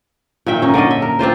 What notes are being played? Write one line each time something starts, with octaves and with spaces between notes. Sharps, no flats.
A#2 D#3 E5 G5
C#4 D#4
D3 C#4 D5 D#5
E5
A#4
C4 D4 F4 C5